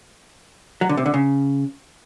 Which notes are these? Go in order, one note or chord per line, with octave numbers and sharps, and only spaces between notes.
F#3
D3
C3
D3
C#3